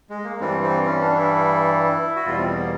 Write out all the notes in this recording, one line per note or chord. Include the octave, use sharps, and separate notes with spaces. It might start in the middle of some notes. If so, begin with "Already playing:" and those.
G#3
A#3
G2 E3 G3 C4
C4
C#4
D4
E4
F#4
E2 B2 G3 F4
C4
B3
A#3